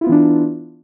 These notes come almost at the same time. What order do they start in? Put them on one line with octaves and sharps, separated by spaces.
E4 F4 B3 E3 D4